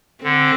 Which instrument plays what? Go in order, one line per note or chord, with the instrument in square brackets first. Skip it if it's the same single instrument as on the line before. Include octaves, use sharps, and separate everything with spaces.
[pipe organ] D3 [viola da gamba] C4